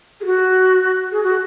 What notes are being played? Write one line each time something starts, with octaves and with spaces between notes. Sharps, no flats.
G#4
F#4
G#4
F#4